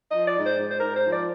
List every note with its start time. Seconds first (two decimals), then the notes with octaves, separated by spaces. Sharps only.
0.09 D#5
0.15 F3
0.26 D5
0.38 G#2
0.43 C5
0.60 G#2
0.68 C5
0.78 G#2 A#4
0.95 C5
1.05 F3
1.11 D5